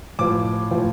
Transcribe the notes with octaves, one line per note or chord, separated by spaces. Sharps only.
A2 F3 D6
A2 F3